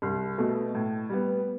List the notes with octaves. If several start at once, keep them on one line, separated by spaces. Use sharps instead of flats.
C2
B2 A3
A2
G3 B3